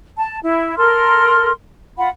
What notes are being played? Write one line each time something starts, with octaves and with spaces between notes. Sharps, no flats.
A5
E4
A4 A#4 C6 F6
F4 F#5 B5